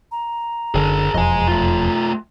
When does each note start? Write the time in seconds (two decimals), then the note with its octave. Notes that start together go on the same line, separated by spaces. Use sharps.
0.12 A#5
0.75 F#1 D3 G#4 A#4
1.14 E1 F2 D#5 G#5
1.47 A3 F4